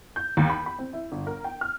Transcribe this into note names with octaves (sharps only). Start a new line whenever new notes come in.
G6
D#2
B5
B5
C4
E4
G1
A#4
G5
F6